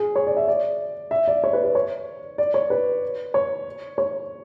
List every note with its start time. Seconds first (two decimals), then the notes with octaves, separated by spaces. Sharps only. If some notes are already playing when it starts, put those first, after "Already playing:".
Already playing: G#4
0.16 C#5
0.27 D5
0.37 E5
0.48 D5
1.11 E5
1.28 D5
1.44 C#5
1.53 B4
1.64 B4
1.75 C#5
2.38 D5
2.54 C#5
2.70 B4
3.34 C#5
3.98 C#5